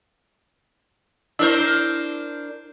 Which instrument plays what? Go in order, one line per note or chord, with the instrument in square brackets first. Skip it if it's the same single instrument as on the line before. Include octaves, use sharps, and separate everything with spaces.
[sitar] D4 A#4 C5 [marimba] E4